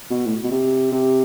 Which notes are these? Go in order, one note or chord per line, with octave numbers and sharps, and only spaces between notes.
B2
A2
B2
C3
C3